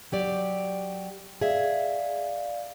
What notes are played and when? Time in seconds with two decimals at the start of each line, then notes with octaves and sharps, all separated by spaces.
0.12 F#3 G4 D5
1.41 G#4 D5 E5 F5